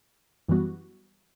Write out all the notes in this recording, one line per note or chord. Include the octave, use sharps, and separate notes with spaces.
F#2 E3 G3 B3 F#4